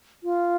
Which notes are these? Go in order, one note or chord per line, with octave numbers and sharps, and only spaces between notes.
F4